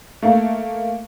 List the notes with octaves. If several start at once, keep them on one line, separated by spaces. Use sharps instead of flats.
A3 A#3